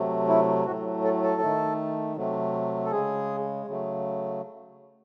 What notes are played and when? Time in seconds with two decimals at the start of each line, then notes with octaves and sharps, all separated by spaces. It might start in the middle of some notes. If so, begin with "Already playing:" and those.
Already playing: C3 F#3 A3
0.29 E4
0.66 A2 F#3 A3 F#4
1.04 A4
1.23 A4
1.41 D#3 A3
2.16 C3 F#3 A3
2.85 A4
2.91 C#3 G#3 G#4
3.67 C#3 F#3 A3